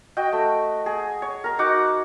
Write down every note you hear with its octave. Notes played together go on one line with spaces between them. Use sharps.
F#4 D#5 G5
A3
G#4
C#5
A#4 A#5
D#4 F#4 F#5 D6